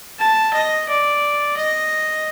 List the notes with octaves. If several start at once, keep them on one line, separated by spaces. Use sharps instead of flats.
A5
D#5
D5
D#5